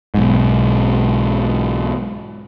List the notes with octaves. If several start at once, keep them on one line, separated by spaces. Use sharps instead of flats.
B1 G#2